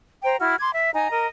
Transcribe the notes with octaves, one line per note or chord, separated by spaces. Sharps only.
C5 G5 A#5
E4 F#4 F6
C6 D6 G#6
E5
D#4 G#5 A#5
A#4 D#5